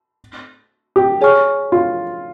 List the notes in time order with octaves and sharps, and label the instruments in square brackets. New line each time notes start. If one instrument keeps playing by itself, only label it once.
[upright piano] G4
[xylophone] G#4 C#5 G#5 C#6 F6
[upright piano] F4